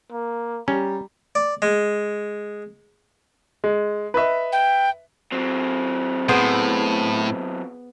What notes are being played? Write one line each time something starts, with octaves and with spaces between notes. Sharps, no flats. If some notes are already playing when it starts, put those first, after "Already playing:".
A#3
G3 C#4 A#5
D5
G#3
G#3
B4 D#5 E5
G5
F#3 C4
A2 B3 G#4 C5